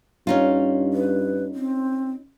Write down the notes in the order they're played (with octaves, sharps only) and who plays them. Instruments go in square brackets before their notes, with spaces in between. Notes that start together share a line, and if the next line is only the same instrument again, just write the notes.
[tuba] G2 [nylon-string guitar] C#4 D#4 F4
[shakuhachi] B4
C4